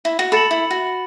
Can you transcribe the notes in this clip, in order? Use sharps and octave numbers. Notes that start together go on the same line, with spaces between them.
E4
F#4
A4 B5 A6 C#7 F#7
E4
F#4